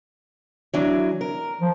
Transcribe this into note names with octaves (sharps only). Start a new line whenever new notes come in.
E3 F#3 D4
A#4
F3